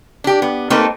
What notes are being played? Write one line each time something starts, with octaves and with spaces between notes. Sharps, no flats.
D4 G4
B3
A3 A#3 C4 D#4 A4 B4